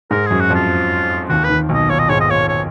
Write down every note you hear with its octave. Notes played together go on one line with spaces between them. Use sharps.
G#2 G#3 A#4
F#2 F#3 G#4
F#4
F2 F3 F4
D#2 D#3 F#4
B4
D#2 D#3
B1 B2 D#5
A#2 C#5
D#5
G#2 C#5
D#5
A#2 C#5
C#5